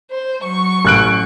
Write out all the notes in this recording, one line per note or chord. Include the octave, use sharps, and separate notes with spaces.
C5
F#3 C#6
A1 F#6 D7